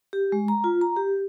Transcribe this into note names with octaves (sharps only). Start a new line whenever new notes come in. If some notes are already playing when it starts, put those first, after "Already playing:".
G4
G#3
A#5
F4
A#5
G4